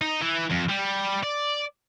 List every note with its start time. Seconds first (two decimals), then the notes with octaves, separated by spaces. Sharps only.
0.01 D#4
0.21 E3
0.51 F2
0.70 G3
1.24 D5